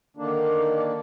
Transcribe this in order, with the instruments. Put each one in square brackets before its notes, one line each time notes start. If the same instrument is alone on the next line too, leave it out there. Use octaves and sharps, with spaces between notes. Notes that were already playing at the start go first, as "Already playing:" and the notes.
[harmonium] D3 D#3 A#3 D4